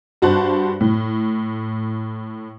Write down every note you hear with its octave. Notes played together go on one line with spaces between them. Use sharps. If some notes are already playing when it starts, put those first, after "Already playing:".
G2 F#4 C5 A5 F#6
A2